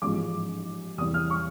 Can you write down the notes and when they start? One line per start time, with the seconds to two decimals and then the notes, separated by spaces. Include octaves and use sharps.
0.02 A1 G#2 F3 G#3 D6
0.98 E2 C3 E3 G3 D#6
1.14 F6
1.30 C#6